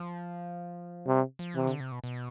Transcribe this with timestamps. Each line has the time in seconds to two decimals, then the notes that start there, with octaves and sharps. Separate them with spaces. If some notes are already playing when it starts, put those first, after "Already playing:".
Already playing: F3
1.07 C3 G3
1.39 F3
1.55 C3 E3
1.67 D3
1.80 C3
1.92 B2
2.04 B2